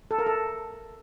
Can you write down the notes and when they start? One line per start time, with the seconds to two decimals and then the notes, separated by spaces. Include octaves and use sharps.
0.11 A4
0.19 A#4
0.26 A4